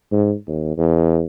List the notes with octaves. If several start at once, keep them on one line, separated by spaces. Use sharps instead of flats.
G#2
D#2
E2